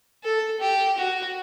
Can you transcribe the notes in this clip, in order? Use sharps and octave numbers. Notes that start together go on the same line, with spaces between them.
A4
G4
F#4